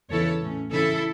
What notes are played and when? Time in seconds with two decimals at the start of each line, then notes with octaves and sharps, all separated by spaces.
0.10 E2 C#3 E3 B3 E4 A4 C#5
0.41 A2 A3 C#4
0.71 C#3 E3 C#4 E4 A4